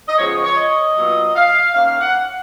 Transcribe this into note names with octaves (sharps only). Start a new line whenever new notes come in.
D#5
C#3 F3 G#3 B3 C#5
C#5
C#5
D#5
A#2 F#3 B3 F4
F5
D#3 A#3 C#4 F5
F5
F#5